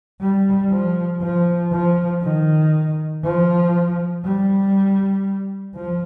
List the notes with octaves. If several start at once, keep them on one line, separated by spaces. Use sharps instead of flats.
G3
F3
F3
F3
D#3
F3
G3
F3